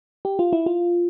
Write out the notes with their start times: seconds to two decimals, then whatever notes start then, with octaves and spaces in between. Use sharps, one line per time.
0.25 G4
0.39 F4
0.53 E4
0.66 F4